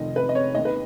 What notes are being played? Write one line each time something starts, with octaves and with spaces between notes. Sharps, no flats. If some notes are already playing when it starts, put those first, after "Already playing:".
Already playing: F1 F2 D#3 D#5
B4
D#5
C#5
D#2 D#3 D#5
B4